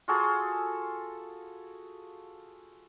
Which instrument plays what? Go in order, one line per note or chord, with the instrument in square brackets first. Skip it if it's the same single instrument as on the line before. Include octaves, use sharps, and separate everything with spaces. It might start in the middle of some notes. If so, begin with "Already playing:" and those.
[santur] F4 F#4 G#4 A4